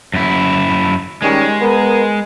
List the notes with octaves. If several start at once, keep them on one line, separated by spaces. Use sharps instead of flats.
F#2 E4
D#3 G3 G#3 C#4
B3 A#4